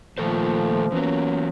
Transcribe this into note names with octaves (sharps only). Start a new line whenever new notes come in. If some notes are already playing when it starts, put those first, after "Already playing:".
A#2 D#3 F3 A3 A4 C5
E3 F#3 A#3 B3 C#4